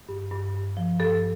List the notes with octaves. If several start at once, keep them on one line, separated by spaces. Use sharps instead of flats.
G2
G2
G2
F3
G2 A4